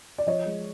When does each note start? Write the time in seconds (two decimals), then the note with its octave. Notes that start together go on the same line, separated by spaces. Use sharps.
0.18 D5
0.27 F3 C#5 D#5
0.46 G#3